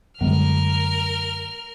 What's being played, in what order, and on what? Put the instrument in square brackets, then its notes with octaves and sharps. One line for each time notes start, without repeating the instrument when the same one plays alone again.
[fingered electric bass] F#2 D3 G3 [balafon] G#3 B3 [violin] A#4 F6